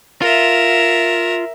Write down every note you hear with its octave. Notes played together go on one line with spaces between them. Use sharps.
F4 A#4 E5